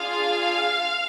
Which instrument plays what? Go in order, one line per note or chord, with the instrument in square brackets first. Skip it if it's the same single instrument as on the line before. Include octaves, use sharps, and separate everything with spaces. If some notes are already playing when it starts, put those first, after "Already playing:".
Already playing: [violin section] D4 F4 G#4 F5 F6